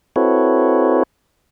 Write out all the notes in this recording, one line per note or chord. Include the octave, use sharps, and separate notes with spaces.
C4 E4 F#4 A4 B4 C#5